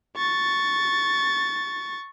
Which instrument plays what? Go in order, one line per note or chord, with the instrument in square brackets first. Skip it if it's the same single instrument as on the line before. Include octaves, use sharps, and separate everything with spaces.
[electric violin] C#6 A6